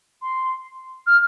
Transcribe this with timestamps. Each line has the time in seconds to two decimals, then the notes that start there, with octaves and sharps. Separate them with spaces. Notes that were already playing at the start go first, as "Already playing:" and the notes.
0.21 C6
1.06 F6